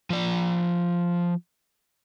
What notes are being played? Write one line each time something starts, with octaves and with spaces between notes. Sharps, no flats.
F3 D5